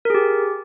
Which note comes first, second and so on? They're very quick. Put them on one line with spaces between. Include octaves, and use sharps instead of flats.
A#4 G#4 G4